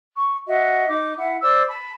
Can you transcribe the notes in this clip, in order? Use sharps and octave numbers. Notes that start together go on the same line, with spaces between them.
C#6
F#4 D#5 E5 F#5
D#4 D6
E4 E5 F#5
C5 D5 D6 E6
A5 B5